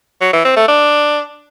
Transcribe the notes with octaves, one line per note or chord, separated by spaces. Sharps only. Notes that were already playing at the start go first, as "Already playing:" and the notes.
F#3
E3
C4
A3
D4